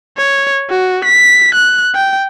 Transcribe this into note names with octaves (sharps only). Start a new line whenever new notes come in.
C#5
F#4
B6
F#6
G5